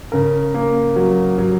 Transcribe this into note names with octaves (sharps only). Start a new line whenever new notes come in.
C#3 A#4
A#3
F#3
F#3